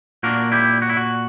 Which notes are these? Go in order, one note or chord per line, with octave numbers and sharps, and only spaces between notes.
A#2 A#3 D4 F#4 A#4
E4 G4
F#4
E4
F#4